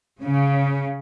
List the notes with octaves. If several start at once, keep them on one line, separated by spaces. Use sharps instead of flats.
C#3